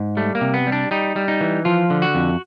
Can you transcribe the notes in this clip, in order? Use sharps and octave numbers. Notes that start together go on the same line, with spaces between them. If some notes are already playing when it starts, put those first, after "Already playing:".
Already playing: G#2
G3 A3
A#3
C3
B3
G3
D4
G3 D#4
G3
D#4
E3
F3 F4
D3
F#4
F2